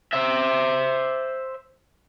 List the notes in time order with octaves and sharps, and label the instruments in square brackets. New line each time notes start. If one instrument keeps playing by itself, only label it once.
[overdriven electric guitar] C5 E5